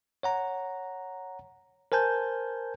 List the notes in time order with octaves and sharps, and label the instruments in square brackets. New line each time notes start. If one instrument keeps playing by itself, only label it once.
[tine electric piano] C#5 F#5 A#5
A#4 C5 G#5 A5 G6